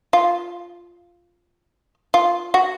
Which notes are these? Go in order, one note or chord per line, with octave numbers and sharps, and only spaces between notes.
F4
F4
F#4